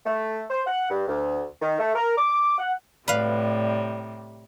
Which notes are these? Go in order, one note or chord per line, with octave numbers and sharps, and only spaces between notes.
A3
C5
F#5
G2
D2
D#3
A3
A#4
D6
F#5
A2 C3 G3 B4 D5 F5